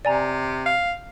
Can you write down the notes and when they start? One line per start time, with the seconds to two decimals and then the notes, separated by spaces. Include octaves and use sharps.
0.05 C3 D5 G#5 A#5
0.66 F5